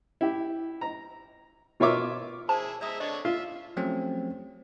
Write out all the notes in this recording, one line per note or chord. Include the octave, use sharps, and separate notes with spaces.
E4 G4
A#5
B2 F4 A#4 C#5 E5 D6
E4 G#4 C5 A5
G#3 D5 E5 A#5 D#6
D3 D4 C#5 D#5
F4 E5
F3 F#3 A3 C4 C#4 G4